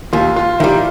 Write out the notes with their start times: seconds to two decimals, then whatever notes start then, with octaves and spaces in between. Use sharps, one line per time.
0.13 D#2 F4
0.36 F4
0.60 D#3 G3 E4